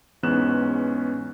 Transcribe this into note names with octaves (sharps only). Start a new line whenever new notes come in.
E2 G#2 B3 C#4 F#6 E7